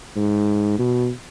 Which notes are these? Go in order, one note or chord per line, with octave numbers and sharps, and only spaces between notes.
G#2
B2